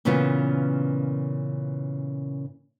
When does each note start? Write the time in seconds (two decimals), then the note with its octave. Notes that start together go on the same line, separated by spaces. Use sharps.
0.05 A#2 C#3 E3 B3 C#4 F4